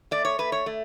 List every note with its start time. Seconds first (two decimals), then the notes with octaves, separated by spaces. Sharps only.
0.11 A3 D5
0.25 C#5
0.39 A3 B4
0.52 C#5
0.66 A3